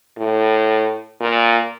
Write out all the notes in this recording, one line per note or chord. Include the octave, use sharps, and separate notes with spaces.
A2
A#2